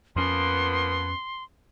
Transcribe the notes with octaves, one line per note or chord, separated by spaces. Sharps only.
F2 F3 A#3 B3 C#4 C6